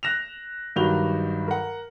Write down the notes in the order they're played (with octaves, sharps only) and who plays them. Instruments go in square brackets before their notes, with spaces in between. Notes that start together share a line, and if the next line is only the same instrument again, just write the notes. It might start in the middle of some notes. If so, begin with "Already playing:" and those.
[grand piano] F#6 A#6 E7 F7
G2 D#3 F#3 F#4 F7 G7
A#4 F#5